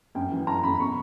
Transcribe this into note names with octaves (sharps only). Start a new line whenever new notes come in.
F#2 G5
E3
F#2 A#5
F#2 B5
B2 C#6